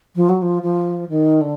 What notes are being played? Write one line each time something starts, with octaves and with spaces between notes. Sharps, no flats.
F3
F#3
F3
F3
D#3
D3